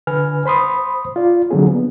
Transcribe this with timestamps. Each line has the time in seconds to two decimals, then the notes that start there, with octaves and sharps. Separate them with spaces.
0.07 D3 B4 G#5 F6
0.46 C5 B5 C6 D#6
1.16 F4 D5
1.51 D3 F3 F#3 A#3 C4 G#4
1.70 B3